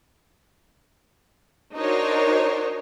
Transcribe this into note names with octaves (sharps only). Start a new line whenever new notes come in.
D4 D#4 F#4 A#4 C5 C#5